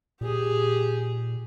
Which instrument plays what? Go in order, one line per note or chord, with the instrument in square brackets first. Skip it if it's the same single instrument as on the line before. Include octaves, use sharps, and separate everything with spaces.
[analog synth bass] A#2 [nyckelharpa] G4 G#4